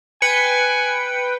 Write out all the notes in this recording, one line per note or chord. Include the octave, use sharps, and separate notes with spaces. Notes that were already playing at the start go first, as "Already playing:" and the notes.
B4 G5 G#5 C#7